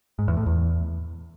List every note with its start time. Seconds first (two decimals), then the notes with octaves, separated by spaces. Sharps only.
0.19 G#2
0.28 E2
0.37 A2
0.46 E2